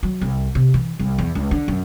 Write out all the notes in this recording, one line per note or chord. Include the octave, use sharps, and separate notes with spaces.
F#3
C2
C3
E3
C2
E2
C#2
D3
F#2